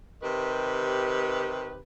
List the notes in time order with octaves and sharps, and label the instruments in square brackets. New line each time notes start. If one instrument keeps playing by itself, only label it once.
[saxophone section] C3 D#3 G4 B4